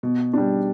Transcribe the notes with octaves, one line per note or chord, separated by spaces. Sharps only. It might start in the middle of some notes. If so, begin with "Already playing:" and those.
B2
G3 D4